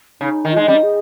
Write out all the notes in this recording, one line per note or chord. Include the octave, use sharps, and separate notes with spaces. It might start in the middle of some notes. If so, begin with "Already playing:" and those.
C#3 D#4
D#3
F4
G#3 D#4
G3 C#4
D#4
G#4